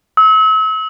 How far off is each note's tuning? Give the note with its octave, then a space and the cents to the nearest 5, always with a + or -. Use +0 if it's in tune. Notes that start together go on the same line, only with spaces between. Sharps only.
E6 -40